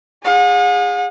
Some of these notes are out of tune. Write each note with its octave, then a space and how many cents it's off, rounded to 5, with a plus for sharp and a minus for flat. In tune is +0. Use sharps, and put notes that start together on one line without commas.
G#4 -20 F#5 -45